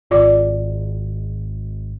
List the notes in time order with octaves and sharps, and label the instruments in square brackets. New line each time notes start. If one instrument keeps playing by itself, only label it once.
[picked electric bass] G#1 [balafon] F4 D5 D6